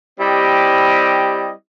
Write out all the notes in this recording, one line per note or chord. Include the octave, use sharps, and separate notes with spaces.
G3 C4 E4 G4 D#5